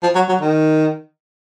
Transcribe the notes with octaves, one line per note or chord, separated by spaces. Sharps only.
F3
F#3
F#3
D#3